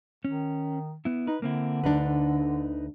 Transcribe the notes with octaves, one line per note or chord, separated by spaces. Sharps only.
D#3 C#4
B3 E4
D#4 B4
D3 A#3 C4 E4
D2 D4 D#4 B4